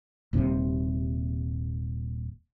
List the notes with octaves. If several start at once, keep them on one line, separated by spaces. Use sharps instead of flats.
D#1 D#2 C3